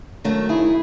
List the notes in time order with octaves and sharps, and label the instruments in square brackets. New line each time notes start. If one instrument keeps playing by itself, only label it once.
[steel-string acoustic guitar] D#3 F#3 A3
D#3 E4 G#4